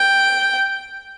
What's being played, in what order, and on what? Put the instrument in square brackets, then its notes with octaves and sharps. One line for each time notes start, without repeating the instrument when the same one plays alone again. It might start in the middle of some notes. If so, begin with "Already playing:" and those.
Already playing: [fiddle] G5